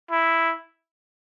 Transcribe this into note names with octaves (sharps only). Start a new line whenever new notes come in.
E4